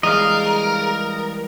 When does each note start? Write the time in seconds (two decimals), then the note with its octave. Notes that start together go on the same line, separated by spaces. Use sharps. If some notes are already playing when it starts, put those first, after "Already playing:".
0.03 E3 G3 G#3 G#4 A#4 D#5 F5